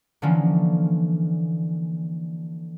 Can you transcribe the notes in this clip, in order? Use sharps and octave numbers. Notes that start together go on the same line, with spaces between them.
D3 E3 F3 A#3 C#4